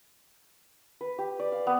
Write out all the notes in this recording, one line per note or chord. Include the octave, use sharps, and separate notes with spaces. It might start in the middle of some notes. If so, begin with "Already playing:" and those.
B4
G4
D5
F5
B3